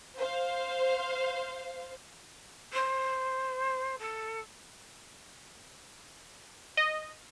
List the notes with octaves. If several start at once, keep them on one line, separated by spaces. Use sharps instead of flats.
C5 F5
C5
A4
D#5